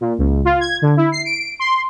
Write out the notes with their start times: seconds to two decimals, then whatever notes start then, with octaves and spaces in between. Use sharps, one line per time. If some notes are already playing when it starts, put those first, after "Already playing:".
0.01 A#2
0.18 C#2
0.45 F4
0.61 G#6
0.82 D3
0.97 E4
1.12 C7
1.25 D7
1.60 C6